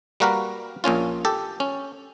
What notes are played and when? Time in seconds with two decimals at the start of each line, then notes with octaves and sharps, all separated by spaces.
0.20 G3 A#3 F#4 A#4 B4
0.84 A#1 A#2 C#4 F4
1.25 G4 A4
1.60 C#4